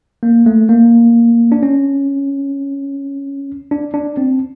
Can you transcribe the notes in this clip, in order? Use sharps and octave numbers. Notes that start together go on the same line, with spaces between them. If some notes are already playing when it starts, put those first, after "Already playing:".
A#3
A3
A#3
D4
C#4
D4
D4
C4